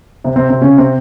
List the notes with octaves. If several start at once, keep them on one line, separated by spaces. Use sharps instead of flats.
C3 C4
C3 C4
C3 C4
C#3 C#4
C3 C4